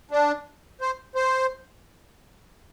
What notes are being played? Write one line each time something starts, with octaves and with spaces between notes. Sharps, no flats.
D4
C5
C5